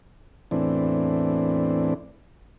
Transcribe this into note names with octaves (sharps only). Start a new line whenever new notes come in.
E2 A2 E3 C4 D4